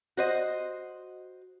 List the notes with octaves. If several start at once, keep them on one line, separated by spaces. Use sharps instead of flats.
F#4 C5 D#5